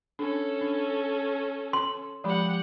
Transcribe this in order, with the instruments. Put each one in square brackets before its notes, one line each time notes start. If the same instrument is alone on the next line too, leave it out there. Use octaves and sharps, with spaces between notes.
[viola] C#4 A4 [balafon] D4
[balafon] D4
[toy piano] C6
[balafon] F3 G#3 B5 [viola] G4 F#5